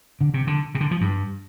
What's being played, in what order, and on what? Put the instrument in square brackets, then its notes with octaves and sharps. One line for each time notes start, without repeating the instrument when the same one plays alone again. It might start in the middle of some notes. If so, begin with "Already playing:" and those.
[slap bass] D3
C3
D3
C3
D3
F3
G2